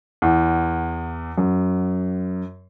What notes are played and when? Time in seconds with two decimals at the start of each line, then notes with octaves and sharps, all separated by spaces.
0.22 E2
1.38 F#2